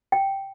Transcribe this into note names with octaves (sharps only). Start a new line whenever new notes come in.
G5